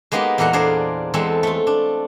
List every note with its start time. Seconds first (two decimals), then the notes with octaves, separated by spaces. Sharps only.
0.12 G#3 A#3 B3 D#4 G4
0.38 E2 A#2 A#3 A4 F#5 A#5
0.53 D4 G#4 A#4 C5 D5
1.14 E2 G#3 C4 A4
1.43 A3 F4
1.67 D4